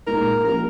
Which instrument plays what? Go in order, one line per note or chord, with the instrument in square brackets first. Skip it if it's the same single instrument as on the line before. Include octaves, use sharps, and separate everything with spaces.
[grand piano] A#2 G#3 D#4 [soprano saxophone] A#4
[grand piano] F3 A#3 C#4 G4 [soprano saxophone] A#4